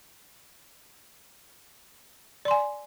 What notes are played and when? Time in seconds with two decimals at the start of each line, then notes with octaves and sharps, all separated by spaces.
2.45 D5
2.48 C6
2.51 G#5